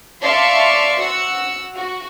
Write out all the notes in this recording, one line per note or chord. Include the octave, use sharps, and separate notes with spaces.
D5 E5 F5 A5 C6 C#6
F#4 F#5 E6
F#4